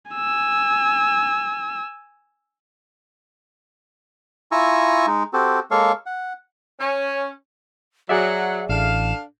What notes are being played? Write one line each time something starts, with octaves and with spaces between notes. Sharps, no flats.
G#5 E6
E4 F4 G#5 A#5 C#6 E6
G#3 D#4
C4 F#4 G4 A4
G#3 A#3 A4 C#5 F5 C#6
F#5
C#4
F#3 G#4 D5 E5 F#5
A1 D4 A4 F5 E7